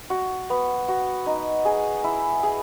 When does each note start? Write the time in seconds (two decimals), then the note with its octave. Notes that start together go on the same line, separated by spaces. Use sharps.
0.10 F#4
0.50 B3
0.88 F#4
1.26 D#4
1.65 G#4
2.04 E4
2.43 G#4